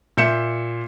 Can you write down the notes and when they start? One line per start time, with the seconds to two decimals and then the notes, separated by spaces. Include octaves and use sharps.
0.17 A#2 E5 G6 C#7 E7